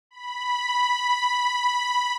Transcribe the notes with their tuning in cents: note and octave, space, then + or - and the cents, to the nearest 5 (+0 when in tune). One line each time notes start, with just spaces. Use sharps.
B5 +0